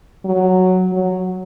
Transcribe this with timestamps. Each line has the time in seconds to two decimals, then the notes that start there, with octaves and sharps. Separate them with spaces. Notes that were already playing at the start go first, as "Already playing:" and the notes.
0.25 F#3
0.92 F#3